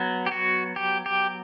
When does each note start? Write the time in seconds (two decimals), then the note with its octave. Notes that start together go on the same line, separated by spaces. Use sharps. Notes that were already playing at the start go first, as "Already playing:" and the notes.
Already playing: F#3 B3
0.26 G4
0.32 F#4
0.76 G4
1.06 G4